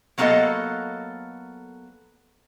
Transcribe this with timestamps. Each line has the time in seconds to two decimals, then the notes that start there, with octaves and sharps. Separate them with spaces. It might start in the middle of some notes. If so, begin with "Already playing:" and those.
0.18 F#3 A#3 B3 F4 A4 D#5